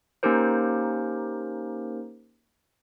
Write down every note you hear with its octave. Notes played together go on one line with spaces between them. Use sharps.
A#3 C#4 D#4 G4 A#4 C5